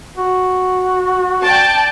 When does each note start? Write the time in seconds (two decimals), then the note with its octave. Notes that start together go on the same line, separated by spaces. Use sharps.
0.17 F#4
1.43 D5 G5 A5